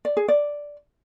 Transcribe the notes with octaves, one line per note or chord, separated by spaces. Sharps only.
D5
G#4
D5